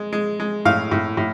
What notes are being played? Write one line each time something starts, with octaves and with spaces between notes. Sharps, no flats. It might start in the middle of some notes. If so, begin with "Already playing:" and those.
Already playing: G#3
G#3
G#3
A2 F5
A2
A2